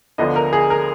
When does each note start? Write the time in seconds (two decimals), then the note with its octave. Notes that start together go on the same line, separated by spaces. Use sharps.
0.18 D2 D3 F3 B3 D4 D#5
0.36 A#4
0.53 G#4
0.70 A#4